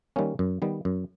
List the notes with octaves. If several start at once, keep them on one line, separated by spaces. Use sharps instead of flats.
D#3 G3 A#3 C#4
F#2
D#3 G3 B3
F#2